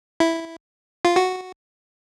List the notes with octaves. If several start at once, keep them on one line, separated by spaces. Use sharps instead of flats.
E4
F4
F#4